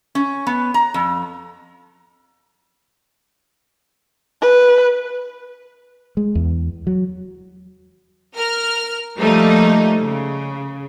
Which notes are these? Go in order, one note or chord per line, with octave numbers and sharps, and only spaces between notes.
C#4
B3
A#5
F2
B4
G#3
E2
F#3
A#4 F6
F3 G3 A3 A#3 D#4
C#3